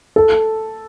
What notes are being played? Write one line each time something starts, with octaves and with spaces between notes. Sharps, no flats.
A4